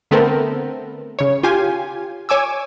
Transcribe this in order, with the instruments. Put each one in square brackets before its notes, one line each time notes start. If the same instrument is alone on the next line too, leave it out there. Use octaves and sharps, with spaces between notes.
[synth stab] D3 A3 B3 C4 A4 A#4
C#3 C#5
F4 G4 G#5
C#5 G#5 D6 E6